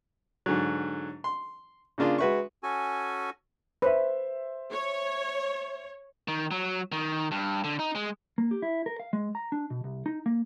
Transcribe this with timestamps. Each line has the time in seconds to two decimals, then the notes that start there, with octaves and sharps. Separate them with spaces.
0.46 G#2 D3 F#3
1.24 C6
1.98 C#3 A#3 D4 F4 G#4
2.18 G#3 F#4 B4 E5 C#6
2.63 C#4 F#4 A4 G#5
3.82 B4 C5 E5
4.71 C#5
6.28 D#3
6.51 F#3
6.92 D#3
7.31 G2
7.64 D3
7.79 D#4
7.95 G#3
8.38 A#3
8.51 G4
8.62 E4
8.86 A#4
9.00 F5
9.13 G#3
9.35 A#5
9.52 D4
9.70 B2
9.84 C2
10.06 D#4
10.26 A#3